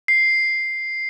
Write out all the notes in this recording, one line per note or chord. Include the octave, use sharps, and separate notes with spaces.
C7